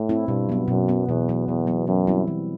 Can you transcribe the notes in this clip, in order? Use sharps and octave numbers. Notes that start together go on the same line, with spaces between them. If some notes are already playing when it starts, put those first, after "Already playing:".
Already playing: A2
C4 E4
G2 B2
F#3 B3
F#2 B2
F#3 B3
E2 B2
F#3 B3
E2 B2
F#3 B3
F#2 E3
G3 C4 E4
E3